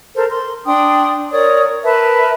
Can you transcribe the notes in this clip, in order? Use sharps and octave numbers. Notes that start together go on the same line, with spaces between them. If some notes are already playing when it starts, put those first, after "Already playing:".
A4 A#4 C5
C6
D4 G5 C6 D#6
A#4 C#5 D5 D#6
A#4 B4 E5 A5